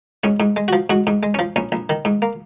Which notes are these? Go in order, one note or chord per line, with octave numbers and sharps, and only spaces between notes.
G#2 C#4
G#2
G#3
F#4
F3
G#2 F#4
G#2
G#3
C#4
F3
A#1 C#4
A#1
D#3
G#2
A#3